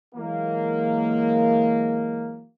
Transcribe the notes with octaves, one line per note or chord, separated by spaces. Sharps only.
E3 F#3 G#3 A#3